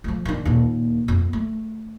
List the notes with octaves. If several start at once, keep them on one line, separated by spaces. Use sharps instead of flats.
F3 A3
D#3 D4
D#2 A#2
F2 B3
A3